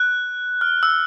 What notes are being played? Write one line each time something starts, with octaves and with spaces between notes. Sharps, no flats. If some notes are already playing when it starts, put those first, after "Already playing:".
Already playing: F#6
F6
E6